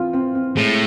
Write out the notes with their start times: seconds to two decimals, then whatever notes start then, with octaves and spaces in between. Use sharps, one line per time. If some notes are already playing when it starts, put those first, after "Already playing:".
Already playing: E3 C4 F4
0.13 C4
0.35 C4
0.56 A2 G#3